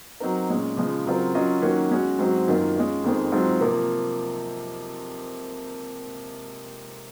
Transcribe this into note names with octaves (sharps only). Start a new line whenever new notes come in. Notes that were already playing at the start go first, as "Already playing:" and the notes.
F#3 C4 D#4 A#4
A#2 G#3 C#4
C#3 F3 G#3
C#3 F#3 C4 F4 A#4
F#3 C#4 F4 A#4 D#5
D#3 F#3 A#3 C#4 F#4
G#3 C#4 F#4
G#2 F#3 C4 F#4
F#2 D#3 A#3 F4
G#3 C#4 F4
F2 D#3 G#3 C4
G#2 F#3 C4 F4
C3 F3 A#3